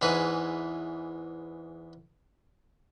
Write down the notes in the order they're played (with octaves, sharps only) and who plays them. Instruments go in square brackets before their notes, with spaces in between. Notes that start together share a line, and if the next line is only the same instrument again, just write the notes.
[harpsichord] E2 G#2 E3 B4 G#5